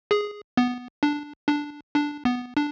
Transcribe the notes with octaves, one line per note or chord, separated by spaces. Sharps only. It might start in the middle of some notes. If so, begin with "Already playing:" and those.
G#4
B3
D4
D4
D4
B3
D4